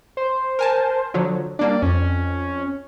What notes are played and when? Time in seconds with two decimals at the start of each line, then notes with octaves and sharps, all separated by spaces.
0.17 C5
0.59 A#4 G#5 A5
1.14 D3 F3 F#3
1.59 G3 A#3 D4 D5
1.82 F2 C#4